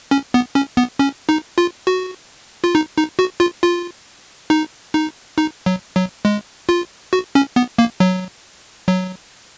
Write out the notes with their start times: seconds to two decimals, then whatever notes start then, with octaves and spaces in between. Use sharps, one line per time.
0.11 C#4
0.34 B3
0.55 C#4
0.77 B3
0.99 C#4
1.29 D#4
1.58 F4
1.87 F#4
2.64 F4
2.75 D#4
2.97 D#4
3.19 F#4
3.40 F4
3.63 F4
4.50 D#4
4.94 D#4
5.38 D#4
5.66 F#3
5.96 F#3
6.25 G#3
6.69 F4
7.13 F#4
7.35 C#4
7.56 B3
7.78 A#3
8.00 F#3
8.88 F#3